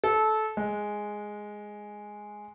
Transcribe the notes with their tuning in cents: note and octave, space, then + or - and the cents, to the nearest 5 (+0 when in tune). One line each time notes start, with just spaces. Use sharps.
A4 -20
G#3 +0